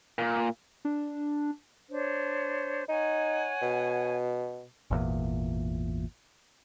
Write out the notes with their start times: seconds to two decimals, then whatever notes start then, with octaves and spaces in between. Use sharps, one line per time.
0.19 A#2
0.85 D4
1.90 D4 C5 C#5
2.89 D#4 C#5 F#5 G#5
3.62 B2
4.91 G#1 E2 A#2